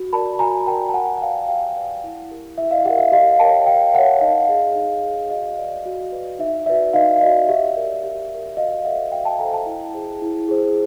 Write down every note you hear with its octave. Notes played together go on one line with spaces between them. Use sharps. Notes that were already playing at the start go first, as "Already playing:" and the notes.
Already playing: F#4
A#4 D5 A5 B5
F#4 G#5 A#5
A#4 D5 G5 A5
A5
G4 F#5 G#5
F#5
B4 D5 F5 G5
G4 F5 G5
B4 D5
E4
G4 A#4
E4 E5
D#5 F5
G4 A#4 E5 F#5
E5
G4 D#5 F5
A#4 C#5 G5 A5
G4 F5 G5
A#4 C#5 E5 F#5
D#4 D#5 F5
G#4 C#5
D#4
G#4 C#5
F#4 D#5 F5
B4 D5
F#4
B4 D5
D#4 E5
F#4 B4 D5 E5
D#4 D#5 F5
F#4 B4 D5 D#5
G4 E5
A#4 D5
G4
A#4 D5
F#4 D#5 F5
A4 C5 E5 F#5
F#4 F5 G5
G5 A5
A4 G#5 A#5
C5
G5 A5
E4
G#4 C5
E4
G#4 C5